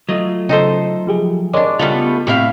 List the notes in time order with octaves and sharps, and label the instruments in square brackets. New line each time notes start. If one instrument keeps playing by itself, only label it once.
[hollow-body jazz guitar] F#3 A3 F4 [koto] D#5
[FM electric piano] C#3 [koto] D#4 A4 C5
[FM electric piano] F3 G4 G#4
[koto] G#3 D4 [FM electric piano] A#4 C#5 D6
[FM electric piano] C#3 [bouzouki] G3 A3 B3 [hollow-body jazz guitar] F4 A4
[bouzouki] A2 E5 F5 [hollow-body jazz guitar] C3 G4